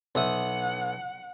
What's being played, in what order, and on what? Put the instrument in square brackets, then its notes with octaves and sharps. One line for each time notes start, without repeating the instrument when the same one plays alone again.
[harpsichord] B1 E5 D#6 [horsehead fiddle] F#5